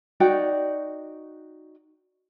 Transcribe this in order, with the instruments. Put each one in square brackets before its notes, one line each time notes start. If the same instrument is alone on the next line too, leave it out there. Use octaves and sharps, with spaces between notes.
[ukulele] D#4 F#4 D5 G5